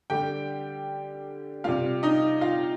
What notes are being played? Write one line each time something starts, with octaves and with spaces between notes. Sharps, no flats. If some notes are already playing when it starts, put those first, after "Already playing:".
D3 G3 G4 G5
C3 G3 F4 F5
D#4 D#5
F4 F5